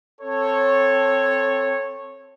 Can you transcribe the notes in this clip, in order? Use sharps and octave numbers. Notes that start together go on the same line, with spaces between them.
C4 A4 C#5